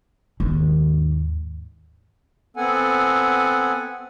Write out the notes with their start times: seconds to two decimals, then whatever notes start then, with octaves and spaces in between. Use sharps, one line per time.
0.40 D#2 G#2 D#3
2.57 B3 C4 A4 F#5 G#5